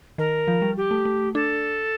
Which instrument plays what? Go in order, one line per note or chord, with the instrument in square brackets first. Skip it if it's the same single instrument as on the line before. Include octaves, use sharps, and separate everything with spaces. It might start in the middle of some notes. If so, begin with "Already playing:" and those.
[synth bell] D#3 [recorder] A#4
[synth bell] F3
G3
[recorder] G4
[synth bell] A3
A3
[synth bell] D4 [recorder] A4